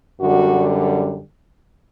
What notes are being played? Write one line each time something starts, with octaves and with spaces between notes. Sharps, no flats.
F#2 D3 G3 F#4